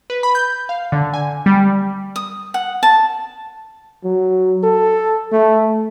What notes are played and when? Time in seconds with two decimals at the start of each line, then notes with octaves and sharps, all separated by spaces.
0.10 B4
0.23 B5
0.35 G6
0.69 F5
0.92 D3
1.14 G#5
1.46 G3
2.16 D#6
2.54 F#5
2.83 A5
4.04 F#3
4.64 A4
5.32 A3